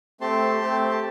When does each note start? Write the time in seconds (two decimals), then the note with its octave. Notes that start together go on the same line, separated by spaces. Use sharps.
0.20 A3 C4 G4 A5 C6
0.61 A3 C4 G4
0.90 A5